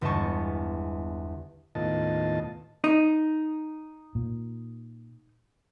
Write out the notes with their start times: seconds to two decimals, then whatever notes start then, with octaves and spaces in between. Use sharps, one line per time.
0.01 G1 E2 G#3 D#5 A5 C#6
1.75 D#2 A2 B3 F4 D#5 A5
2.84 D#4
4.15 A#2